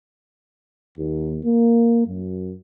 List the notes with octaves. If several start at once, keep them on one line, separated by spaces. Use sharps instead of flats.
D#2
A#3
F#2